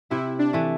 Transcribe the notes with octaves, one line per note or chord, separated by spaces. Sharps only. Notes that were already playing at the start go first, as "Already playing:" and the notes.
C3 E4
D4
E3 A3